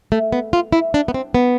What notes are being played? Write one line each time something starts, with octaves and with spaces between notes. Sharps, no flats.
A3
B3
F4
E4
D4
B3
C4
B3